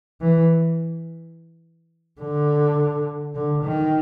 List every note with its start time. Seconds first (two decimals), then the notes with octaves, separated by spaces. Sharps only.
0.22 E3
2.21 D3
3.35 D3
3.64 D#3